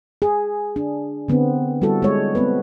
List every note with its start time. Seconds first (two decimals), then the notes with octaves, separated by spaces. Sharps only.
0.22 G#4
0.76 D4
1.28 D3 B3 C4
1.82 G3 E4 F#4 A4
2.02 G#3 C#5
2.35 B3 C4 B4